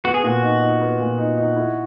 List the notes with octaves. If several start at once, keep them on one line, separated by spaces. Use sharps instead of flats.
B3 F#4
G#4
A#2 F#4
D#4
D#4
B3
A#2
D#4
D#4
E4